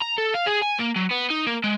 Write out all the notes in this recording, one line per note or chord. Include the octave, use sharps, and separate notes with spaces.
A#5
A4
F5
G#4
G#5
A#3
F#3
B3
D#4
A#3
G#3